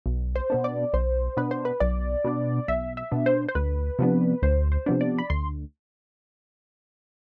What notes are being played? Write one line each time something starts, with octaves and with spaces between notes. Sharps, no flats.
B1
C5
B2 B3 D4
D5
B1 C5
B2 B3 D4 B4
C5
B4
B1 D5
B2 B3 D4
B1 E5
E5
B2 B3 D4
C5
C5
D2 B4
C3 F3 B3 D4
D2 C5
C5
C3 F3 B3 D4
D5
B5
D2 C6